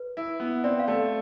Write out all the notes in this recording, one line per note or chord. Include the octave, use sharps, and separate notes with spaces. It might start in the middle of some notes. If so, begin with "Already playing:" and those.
Already playing: B4
E4
B3
C4 D5
F5
A3